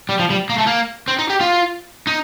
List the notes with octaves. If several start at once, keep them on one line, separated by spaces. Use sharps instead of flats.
G3
F3
G3
A#3
A3
A#3
C4
D#4
G4
F4
D#4